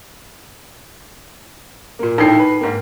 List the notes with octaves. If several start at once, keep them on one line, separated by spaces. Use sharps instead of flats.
A#2 A#3
A#1 A2 D#4 G5 C7
B4
G#2 A#3